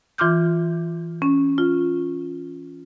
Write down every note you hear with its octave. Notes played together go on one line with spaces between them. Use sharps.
E3 F4 C6 D6 F6 G6
C#4
F4